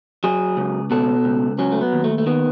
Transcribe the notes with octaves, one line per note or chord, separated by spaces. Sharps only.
F#3 G#4
C#2
B2 A4
C#2
F#3 C#4
A3
B3
D#2
A3
A3
D#3 B3